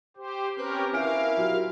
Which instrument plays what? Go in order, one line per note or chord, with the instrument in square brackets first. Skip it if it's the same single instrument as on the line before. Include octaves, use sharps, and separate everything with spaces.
[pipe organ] G4 C5
[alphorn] C4 [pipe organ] C#4 G4 A#4 [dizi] B4
[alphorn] E4 [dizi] A#4 [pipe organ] F5 [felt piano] G#5 F6 D7
[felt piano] F#3 F4 G4